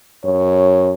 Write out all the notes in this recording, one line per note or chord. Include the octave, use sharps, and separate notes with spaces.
F#2 C#5